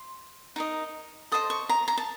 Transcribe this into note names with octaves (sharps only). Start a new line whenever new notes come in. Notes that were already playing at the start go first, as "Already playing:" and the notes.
Already playing: C6
D#4 A#4 D#5
A4 C5 D#5 D#6
C#6
A#5
A#5
A5